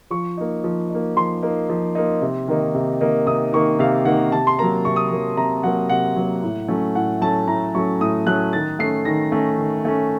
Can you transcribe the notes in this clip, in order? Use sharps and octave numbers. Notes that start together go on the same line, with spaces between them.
F3 C#6
A#3 D#4
F3
A#3 D#4
F3 C6
A#3 D#4
F3
A#3 D#4
C3
D#3 A#3 D#4
C3
D#3 A#3 D#4
C3 D#6
D#3 A#3 D#4 C#6
C3 F5
D#3 A#3 D#4 F#5
C3 A5
C6
F#3 A#3 A#5
C3 C#6
D#6
F#3 A#3 C#6
C3 A#5
F#3 A#3 F#5
C3 F#5
F#3 A#3
A2
F#3 A3 C#4
A2 F#5
F#3 A3 C#4 A5
A2 A#5
F#3 A3 C#4 C#6
A2 D#6
F#3 A3 C#4 F#6
D#3 A6
A3 C#4 C7
D#3 A#6
A3 C#4
D#3
A3 C#4